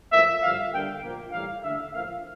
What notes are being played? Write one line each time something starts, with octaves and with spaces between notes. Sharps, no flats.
A2 F3 A#3 E5
G2 D3 F3 F5
D3 G3 A#3 G5
A#2 F3 A#3
A2 E3 G3 A#3 F5
D3 A3 E5
A2 F3 A#3 F5